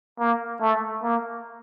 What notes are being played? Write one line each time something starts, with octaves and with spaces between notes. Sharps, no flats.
A#3
A3
A#3